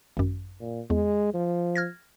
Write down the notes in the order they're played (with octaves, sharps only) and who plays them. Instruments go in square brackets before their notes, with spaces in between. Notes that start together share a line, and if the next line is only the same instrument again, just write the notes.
[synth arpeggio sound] G#1 F#2
[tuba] A#2
[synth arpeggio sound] E2 [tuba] G#3
[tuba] F3
[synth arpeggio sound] F6 G#6 A#6